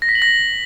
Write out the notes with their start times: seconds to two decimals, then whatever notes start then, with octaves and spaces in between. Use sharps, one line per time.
0.02 A#6
0.09 B6
0.15 F#7
0.22 A#6